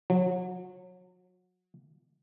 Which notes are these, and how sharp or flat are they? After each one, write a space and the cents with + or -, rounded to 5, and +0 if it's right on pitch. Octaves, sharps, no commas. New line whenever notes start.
F#3 -30